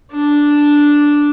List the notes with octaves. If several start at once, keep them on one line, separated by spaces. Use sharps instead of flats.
D4